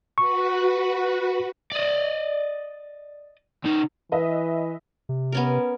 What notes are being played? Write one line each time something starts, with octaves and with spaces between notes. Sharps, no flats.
F#4 B4 C#6
D5 D#5
C#3 D#4
E3 B4 D#5 E5
C3
B3 C#4 A#4